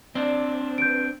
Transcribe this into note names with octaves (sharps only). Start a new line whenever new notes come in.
C4 D4 D5
B4 G6 D7